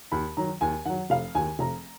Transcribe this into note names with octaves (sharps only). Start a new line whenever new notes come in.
D#2 B5
D#3 F#3 A#5
D#2 G#5
D#3 F#3 F#5
F1 F5
D#2 D#3 G#5
F1 A#5